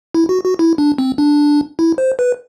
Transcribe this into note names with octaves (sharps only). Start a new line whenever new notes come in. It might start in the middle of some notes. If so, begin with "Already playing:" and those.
E4
F#4
F#4
E4
D4
C4
D4
E4
C5
B4